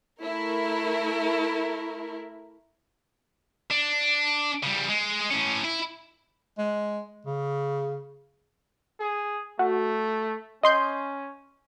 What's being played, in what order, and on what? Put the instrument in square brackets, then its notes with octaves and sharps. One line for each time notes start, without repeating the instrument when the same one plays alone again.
[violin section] A3 E4 A#4
[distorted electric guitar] D4
C#3 G3
G#3
A2 C#4
E4
[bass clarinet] G#3
C#3
[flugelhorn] G#4
[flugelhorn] A3 [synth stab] F#4
[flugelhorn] C#4 [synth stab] D#5 C6 G6